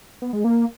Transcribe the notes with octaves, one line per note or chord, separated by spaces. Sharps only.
B3
G#3
A#3